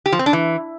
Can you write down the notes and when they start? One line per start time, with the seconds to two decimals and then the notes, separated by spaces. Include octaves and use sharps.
0.06 G4
0.12 F3
0.19 C4
0.26 D4
0.33 E3